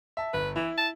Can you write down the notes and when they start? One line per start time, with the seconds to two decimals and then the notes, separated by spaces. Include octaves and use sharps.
0.17 E5 A5
0.34 G1 B4
0.56 E3 E4
0.78 A5